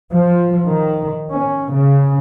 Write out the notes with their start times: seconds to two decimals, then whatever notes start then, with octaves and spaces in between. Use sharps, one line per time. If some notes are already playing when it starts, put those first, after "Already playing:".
0.12 F3
0.67 D#3
1.31 C#4
1.72 C#3